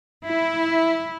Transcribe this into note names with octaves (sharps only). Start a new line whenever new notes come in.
E4